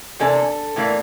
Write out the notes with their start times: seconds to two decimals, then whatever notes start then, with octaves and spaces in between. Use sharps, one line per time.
0.20 C3 E3 A#3 D4 A4
0.76 A2 E3 A#3 D4